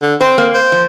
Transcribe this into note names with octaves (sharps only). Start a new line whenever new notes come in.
D3
C4 C5
A#3
C5
F3